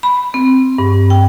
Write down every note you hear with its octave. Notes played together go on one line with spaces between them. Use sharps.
B5
C4
G2
G5